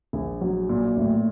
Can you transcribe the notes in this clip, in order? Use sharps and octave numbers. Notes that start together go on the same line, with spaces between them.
A#1
F#3
A#2
A1